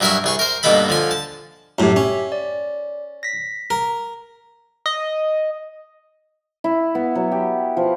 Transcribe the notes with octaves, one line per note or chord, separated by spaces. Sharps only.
G2 F#3 A#4 E5 G#5 C#6
C2 G#4 C#6
A#4 C5
G2 B2 A#3 D#4 A4 B5
D3 F3 G#5
A5
F#2 A2 G4 E5
C#4
D5
A#6 B6
A#4
D#5
E4
B3
F#3
G4
F3